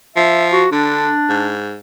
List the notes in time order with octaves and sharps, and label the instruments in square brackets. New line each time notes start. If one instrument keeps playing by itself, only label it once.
[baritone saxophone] F3 [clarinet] E5
[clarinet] F#4
[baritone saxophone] D3 [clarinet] D4
[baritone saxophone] G#2